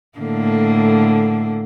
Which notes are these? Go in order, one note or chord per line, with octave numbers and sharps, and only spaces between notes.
A2 D3 A#3